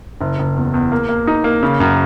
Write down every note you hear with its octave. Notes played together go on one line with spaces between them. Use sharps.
F#1
F#1
E2
E2
A#3
A#3
D#4
A#3
C#3
F#2